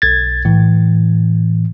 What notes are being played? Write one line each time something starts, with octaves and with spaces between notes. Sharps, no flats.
B1 G#6 A6
A2 E3